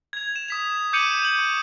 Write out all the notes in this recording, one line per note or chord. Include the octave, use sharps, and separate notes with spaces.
G#6 F7
E7
D#6 B6 F7
D6 G6 C#7 D#7 F7 F#7
F#7
C#6